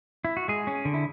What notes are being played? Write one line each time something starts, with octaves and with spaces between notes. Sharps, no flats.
E4
F#4
G#3 G#4
C#4
D3
E4